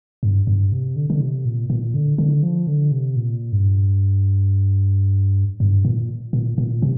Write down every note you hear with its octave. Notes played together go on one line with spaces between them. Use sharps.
G2
G2
C3
D3
D3
C3
A#2
A#2
D3
D3
F3
D3
C3
A#2
G2
G2
A#2
A#2
A#2
C3